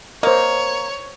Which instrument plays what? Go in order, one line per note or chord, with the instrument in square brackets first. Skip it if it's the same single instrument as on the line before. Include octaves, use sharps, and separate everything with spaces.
[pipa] A#3 [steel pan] C5 D#5 [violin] C#5